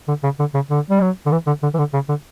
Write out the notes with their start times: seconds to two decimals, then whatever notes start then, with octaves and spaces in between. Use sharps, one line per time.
0.08 D3
0.24 C#3
0.39 D3
0.54 C#3
0.70 D3
0.90 G3
1.01 F#3
1.26 D3
1.32 E3
1.47 D3
1.63 D3
1.74 E3
1.78 D3
1.94 C#3
2.09 D3